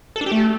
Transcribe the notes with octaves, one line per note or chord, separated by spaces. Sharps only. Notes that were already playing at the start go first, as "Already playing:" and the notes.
A4
D4
G4
A3